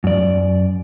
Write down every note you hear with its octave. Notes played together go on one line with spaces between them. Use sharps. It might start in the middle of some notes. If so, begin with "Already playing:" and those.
F#2 D5